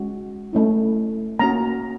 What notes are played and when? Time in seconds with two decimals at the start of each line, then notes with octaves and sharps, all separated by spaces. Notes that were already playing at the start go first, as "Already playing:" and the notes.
Already playing: G#3 C#4 F#4
0.53 A3 C#4 E4
1.39 A#3 C#4 F#4 A#5